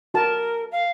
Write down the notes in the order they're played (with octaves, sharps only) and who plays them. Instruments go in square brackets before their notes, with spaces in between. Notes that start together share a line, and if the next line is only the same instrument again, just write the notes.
[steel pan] F#4 A5 [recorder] A#4
[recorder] F5